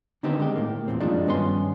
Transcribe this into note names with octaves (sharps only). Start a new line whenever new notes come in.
D3 D#3 B3 C4 D#4 G4
G#3 G4
A2 A#3
E2 G2 A#2 C4
F#2 F3 F#3 G#3 D4 D#4
G2 D#3 B3 C#4 G4 C6